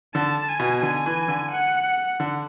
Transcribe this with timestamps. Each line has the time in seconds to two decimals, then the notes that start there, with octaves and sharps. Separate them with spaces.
0.15 D3 A5
0.49 G#5
0.60 B2
0.82 D3 G#5
1.06 E3
1.28 D3
1.52 F#5
2.20 D3